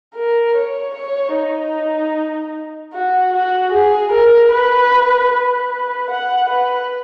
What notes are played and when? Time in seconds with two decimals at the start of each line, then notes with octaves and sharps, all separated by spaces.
0.15 A#4
0.56 C#5
0.94 C#5
1.35 D#4
2.93 F#4
3.33 F#4
3.72 G#4
4.12 A#4
4.51 B4
5.32 B4
6.10 F#5
6.50 B4